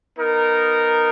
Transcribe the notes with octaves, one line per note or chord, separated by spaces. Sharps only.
B3 D#4 A#4